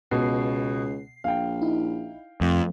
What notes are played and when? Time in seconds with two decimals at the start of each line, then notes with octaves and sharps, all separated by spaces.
0.11 C#2 B2 C7
1.24 A#1 F5 G5
1.61 D#4 E4
2.41 F2 A3